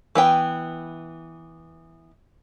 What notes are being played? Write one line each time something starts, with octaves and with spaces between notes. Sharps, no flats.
E3 B3 G5